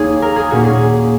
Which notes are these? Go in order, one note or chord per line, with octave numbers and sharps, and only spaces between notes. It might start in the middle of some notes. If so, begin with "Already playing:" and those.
Already playing: D#2 D#3 A#3 D#4 G#4 C#5
A#4
G#4
A#2 A#3 C#4 F#4
G#4